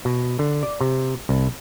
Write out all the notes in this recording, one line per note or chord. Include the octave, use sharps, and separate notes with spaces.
B2
D3
D5
C3
C2